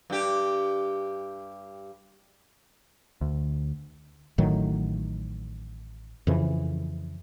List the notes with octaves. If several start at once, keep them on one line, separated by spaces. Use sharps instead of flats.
G2 G4
D2
A1 A2 D#3 F#3
F2 C#3 E3